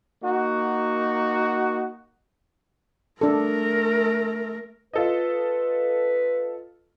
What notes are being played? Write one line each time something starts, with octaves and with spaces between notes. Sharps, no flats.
A#3 D#4 F#4
A3 D4 A4 A#4
F4 A4 B4 D#5